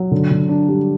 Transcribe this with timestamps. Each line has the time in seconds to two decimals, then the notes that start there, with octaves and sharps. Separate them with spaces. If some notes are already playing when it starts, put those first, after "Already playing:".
Already playing: F#3
0.11 D3
0.31 D3
0.49 D4
0.69 G3